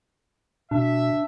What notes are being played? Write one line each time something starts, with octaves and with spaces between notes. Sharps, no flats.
B2 D4 E5